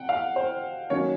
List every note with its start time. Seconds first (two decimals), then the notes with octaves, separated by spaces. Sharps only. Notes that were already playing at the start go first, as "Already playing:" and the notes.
Already playing: F#5 G5
0.09 F5
0.36 C5
0.90 D#3 F#3 A#3 C#4 C#5